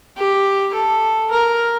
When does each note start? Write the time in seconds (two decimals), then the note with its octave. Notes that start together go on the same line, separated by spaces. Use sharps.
0.17 G4
0.74 A4
1.31 A#4